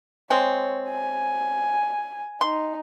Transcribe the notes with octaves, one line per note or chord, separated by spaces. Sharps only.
G#3 C4 C#5
G#5
D#4 C6